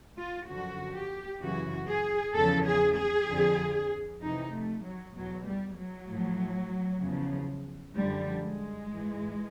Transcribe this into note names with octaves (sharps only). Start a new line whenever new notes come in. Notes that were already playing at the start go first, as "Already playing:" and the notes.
F4
F#2 D3 F3 F#4
G4
F#2 C#3 E3 F#4
G#4
E2 C#3 F3 A4
G#4
G#4
F2 D3 F3
F2 C3 E3 D#4
A3
F#3
E2 B2 F#3
G3
F#3
A2 F3
E2 C#3 F3
F#2 D3 F3 G3
G#3
G#2 E3